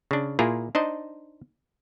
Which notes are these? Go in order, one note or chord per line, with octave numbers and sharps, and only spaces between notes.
C#3 D4
A#2 A#3 E4 F4 G#4 A#5
D4 D#4 C5 D#5